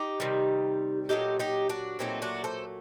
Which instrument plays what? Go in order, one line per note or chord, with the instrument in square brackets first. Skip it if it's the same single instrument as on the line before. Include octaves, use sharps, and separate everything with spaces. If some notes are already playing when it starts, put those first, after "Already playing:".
Already playing: [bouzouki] D#4 G4
C3 D#3 G3
A#2 F#3 A3 D#4 G4
D#4 G4
D4 F#4
A#2 F#3 A3 C4 D#4
D4 F#4
A4 C5